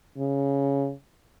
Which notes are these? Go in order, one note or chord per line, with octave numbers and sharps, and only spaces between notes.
C#3